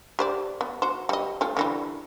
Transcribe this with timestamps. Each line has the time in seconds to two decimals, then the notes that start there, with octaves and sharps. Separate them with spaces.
0.19 G4 C5 D5
0.61 B3
0.82 F#4 C5
1.09 G3 D#5
1.41 A3 F4 G#5
1.57 D3 E3 G3